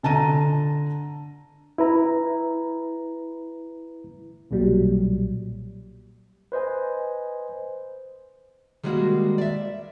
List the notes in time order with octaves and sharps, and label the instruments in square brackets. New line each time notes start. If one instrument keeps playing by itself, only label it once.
[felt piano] D3 A5 A#5 D#7
[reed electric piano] E4 B4 A#5
[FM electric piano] B1 A#2 F#3 G3
[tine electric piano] B4 C5 D#5 G#5
[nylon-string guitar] D#3 G3 G#3 A#3 F#4
D5 E5